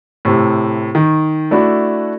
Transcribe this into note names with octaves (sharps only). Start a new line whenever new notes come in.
A2 C3
D#3
A3 D4 E4 F#4